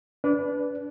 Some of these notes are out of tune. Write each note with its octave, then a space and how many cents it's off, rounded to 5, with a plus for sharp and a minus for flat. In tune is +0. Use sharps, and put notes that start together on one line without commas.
D4 -30 B4 +0 D5 -5